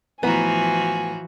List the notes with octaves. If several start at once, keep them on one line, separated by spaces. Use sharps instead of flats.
A2 E3 F3 B3 F#4 G#5 A#5 D#7